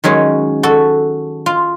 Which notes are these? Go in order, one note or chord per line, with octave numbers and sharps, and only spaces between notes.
D#3 F#3 G#3 C#4
F#4 A4
F4